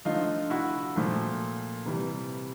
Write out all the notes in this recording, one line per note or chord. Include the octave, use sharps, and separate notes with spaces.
D3 F3 A3 D#4 F4
E4 F#4
A#2 F3 A3
C3 E3 G3